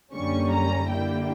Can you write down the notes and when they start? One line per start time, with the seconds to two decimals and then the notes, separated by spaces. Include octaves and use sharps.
0.12 F#2 D3 G3 A#3 C#4 C#6
0.51 A#5
0.89 D3 G3 A#3 E4 G5